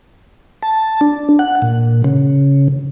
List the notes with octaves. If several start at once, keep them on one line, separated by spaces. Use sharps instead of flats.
A5
D4
F#5
A#2
C#3